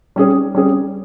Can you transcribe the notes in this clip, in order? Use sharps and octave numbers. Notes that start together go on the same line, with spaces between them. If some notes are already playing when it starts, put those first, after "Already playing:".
G3 C#4 G#4
G3 C#4 G#4